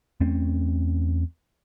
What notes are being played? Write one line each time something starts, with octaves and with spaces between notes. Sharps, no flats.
E2 A3 C4 C#4